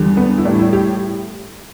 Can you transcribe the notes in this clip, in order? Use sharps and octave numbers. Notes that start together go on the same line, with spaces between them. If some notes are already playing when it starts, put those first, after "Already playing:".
Already playing: E2 D3 G3
B3
E4
A2 G3 D4
E4
G4